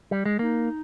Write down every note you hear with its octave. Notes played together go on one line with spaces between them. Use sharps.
G3
G#3
A#3 D#4